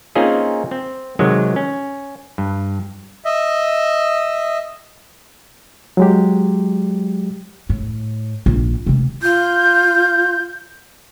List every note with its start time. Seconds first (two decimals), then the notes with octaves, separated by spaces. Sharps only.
0.15 A#3 C4 C#4 D#4 F4 G#4
0.71 C4
1.19 C3 D#3 F#3 G#3
1.56 C#4
2.38 G2
3.25 D#5 E5
5.97 F#3 G#3 G4
7.69 A2
8.46 A#1
8.86 C3 A3
9.22 F4 G6